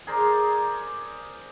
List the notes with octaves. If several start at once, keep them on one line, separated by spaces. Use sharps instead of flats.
G#4 A#4 C5 D5